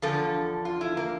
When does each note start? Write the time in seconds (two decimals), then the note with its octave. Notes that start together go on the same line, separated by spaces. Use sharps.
0.02 E2 D3 F3 A4
0.65 F4
0.81 E4
0.97 A#3